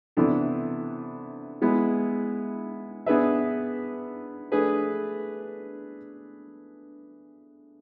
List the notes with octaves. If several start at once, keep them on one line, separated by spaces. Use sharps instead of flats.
C3 E3 B3 D4 A4
G#3 B3 E4
B3 D4 G#4 B4 E5
A3 D4 G#4 B4